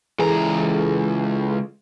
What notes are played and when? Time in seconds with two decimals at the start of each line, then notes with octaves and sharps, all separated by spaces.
0.19 C#2 E3 G#4 A4 A#5